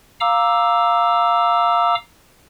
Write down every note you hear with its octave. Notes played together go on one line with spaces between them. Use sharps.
F5 A#5 D6 E6